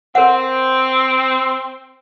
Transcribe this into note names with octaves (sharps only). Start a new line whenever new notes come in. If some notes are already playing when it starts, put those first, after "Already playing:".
C4 A#4 F#5